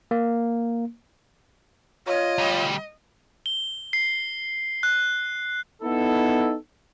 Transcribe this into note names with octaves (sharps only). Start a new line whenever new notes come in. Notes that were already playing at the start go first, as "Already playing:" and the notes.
A#3
F4 C#5 D#5
D2 G3
G7
C7
F#6
B3 D#4 E4 A4